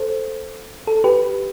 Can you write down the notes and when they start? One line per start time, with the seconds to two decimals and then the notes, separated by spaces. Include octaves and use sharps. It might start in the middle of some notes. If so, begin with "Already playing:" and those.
Already playing: A4 C5
0.87 A4
1.04 G4 B4